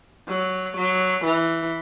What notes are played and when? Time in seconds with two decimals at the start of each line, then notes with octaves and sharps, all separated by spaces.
0.29 F#3
0.77 F#3
1.25 E3